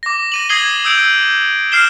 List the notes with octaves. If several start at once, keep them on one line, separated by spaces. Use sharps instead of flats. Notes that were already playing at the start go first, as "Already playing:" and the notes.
D6 A#6
A#6 D#7 F#7
D#6 G#6 C7 G7
D#6 E6 G6 D7
F6 C7 E7 G7